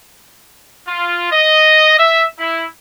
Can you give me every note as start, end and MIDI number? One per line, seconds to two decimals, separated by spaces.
0.87 1.29 65
1.32 1.96 75
1.99 2.24 76
2.39 2.63 64